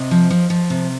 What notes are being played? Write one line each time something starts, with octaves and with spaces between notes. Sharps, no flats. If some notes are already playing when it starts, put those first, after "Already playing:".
Already playing: C3 D#5
F3
F3
F3
C3